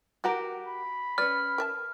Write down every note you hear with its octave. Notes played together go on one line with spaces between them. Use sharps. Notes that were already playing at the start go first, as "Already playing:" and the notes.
E3 F#4 G4 A#4 F#5 A#5
B5
C#4 B4 D5 F6
A#4 E5 A5